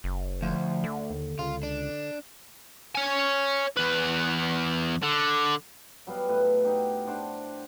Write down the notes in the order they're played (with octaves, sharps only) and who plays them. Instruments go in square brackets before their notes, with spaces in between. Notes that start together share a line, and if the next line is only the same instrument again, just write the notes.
[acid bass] F#1
[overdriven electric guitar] D2 [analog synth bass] F3
[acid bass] D3
[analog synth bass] D#2
[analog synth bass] C#2 [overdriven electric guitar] F4
[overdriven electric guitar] D4
[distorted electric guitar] C#5 G#5
E2 B4
D3
[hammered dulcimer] F#3 G3 B3 F5
A2 B4
D#4 G4
D4 C5 D5 F#5